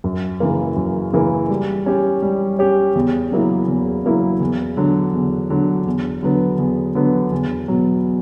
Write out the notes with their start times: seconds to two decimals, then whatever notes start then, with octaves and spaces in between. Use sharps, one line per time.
0.04 F#2
0.40 C#3 E3 A#3
0.76 F#2
1.13 C#3 E3 A#3
1.49 G3
1.86 C#4 G4 C#5
2.22 G3
2.59 C#4 G4 C#5
2.95 E2
3.31 C#3 F#3 A#3 E4
3.68 E2
4.04 C#3 F#3 A#3 E4
4.41 E2
4.77 D3 F#3
5.14 E2
5.50 D3 F#3
5.86 E2
6.23 D3 F#3 B3
6.59 E2
6.95 D3 F#3 B3
7.32 E2
7.68 B2 F#3